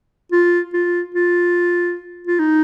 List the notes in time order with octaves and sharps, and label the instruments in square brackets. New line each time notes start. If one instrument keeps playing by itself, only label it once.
[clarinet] F4
F4
F4
F4
D#4